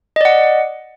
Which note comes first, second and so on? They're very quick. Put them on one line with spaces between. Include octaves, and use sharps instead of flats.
D#5 D5 F#5